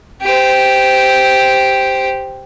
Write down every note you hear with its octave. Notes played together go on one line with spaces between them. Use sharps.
G4 C5